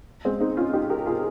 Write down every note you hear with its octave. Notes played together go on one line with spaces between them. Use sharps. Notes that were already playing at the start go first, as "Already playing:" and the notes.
G#3 C4
C4 D#4
C#4 F4
D#4 G4
G4 A#4
F4 G#4